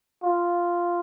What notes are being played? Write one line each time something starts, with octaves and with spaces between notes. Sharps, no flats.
F4